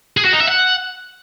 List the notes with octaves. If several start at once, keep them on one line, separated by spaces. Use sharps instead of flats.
G#4
F#4
D#4
E5
F#5